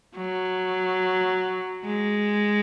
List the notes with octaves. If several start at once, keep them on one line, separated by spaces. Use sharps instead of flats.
F#3
G#3